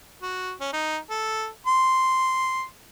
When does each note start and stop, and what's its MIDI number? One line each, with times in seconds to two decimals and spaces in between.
0.22 0.52 66
0.61 0.69 61
0.73 0.97 63
1.10 1.48 69
1.67 2.64 84